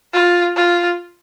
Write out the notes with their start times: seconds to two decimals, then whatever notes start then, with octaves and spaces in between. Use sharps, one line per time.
0.13 F4
0.55 F4